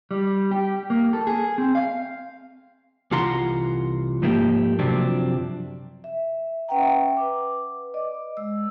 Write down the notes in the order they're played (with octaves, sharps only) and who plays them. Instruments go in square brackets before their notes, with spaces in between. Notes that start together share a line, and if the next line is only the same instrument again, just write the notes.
[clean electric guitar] G3
G4
A#3
A4
G#4
C4
F5
C2 E3 F4 F#5 A#5 C6
G#2 F3 A3 A#3 G4
F#2 C3 F3 F#3 C4 D4
[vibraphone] E5
C#4 B4 E5 F#5 G5 A#5
B4 D6
D5 D#5
G#3 E6